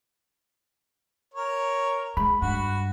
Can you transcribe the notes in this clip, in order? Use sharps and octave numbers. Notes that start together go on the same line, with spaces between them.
A#4 C#5
G#3 B5
G2 F#4